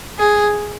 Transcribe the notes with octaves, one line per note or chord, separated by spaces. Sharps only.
G#4